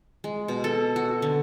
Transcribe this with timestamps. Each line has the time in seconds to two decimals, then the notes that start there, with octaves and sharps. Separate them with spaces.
0.24 G#3
0.48 B2
0.64 A4
0.96 F#4
1.22 D3